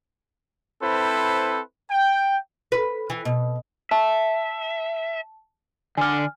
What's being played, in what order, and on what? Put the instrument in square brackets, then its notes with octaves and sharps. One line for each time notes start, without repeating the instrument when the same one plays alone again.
[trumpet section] C4 E4 A4 B4 C5
G5
[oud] B4
E3
B2
[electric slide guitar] E5 [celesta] A5
[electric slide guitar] D3 D5 [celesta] G#5 F6